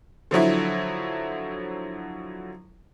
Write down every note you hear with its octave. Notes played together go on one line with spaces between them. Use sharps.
D3 F3 F#3 E4